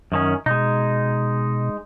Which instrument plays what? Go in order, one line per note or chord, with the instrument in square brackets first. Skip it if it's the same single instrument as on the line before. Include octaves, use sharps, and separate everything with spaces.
[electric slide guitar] F#2 D#3 C#4
[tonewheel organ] B2 [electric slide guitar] G#3 D#4